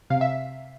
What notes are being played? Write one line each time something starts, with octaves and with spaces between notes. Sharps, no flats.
C3 F5
E5